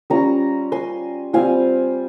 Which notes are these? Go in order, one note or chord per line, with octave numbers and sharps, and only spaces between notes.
G3 C#4 F4 A#5 C#6
G#5 C6
G3 C4 F4 F5 G#5